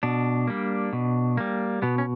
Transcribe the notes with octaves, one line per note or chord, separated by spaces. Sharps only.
B2 D4
G3 A#3
B2
G3 A#3
B2 B3
C#4